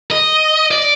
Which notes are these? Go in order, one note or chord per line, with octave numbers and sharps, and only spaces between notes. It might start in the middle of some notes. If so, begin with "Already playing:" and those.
D#5
D5